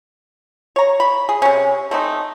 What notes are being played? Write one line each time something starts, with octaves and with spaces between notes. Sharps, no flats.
C#5 A#5
B5
G#4
C3 C#4
A3 C4 D#4